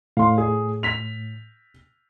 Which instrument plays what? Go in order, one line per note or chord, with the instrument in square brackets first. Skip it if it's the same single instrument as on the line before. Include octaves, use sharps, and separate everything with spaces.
[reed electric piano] A2 [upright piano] F5 C6
[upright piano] G#4
B6 F7